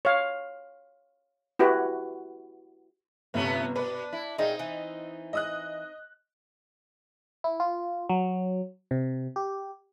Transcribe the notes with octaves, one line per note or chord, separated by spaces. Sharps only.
C#5 F5
E4 F#4 G4 B4
G1 C3 A3 B3 C#4
B2 D4 B4
E4
A#2 G3 G#3 C4 D#4 D#5
E3
D#5 D#6 F#6
E4
F4
F#3
C3
G4